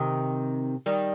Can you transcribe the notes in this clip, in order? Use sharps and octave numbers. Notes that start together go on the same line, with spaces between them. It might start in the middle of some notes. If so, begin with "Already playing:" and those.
Already playing: C3 D#3
D#3 G3